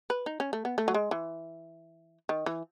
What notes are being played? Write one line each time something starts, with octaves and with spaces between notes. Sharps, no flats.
B4
D#4
C#4
A3
B3
A3
F#3
G#3
E3
D#3
E3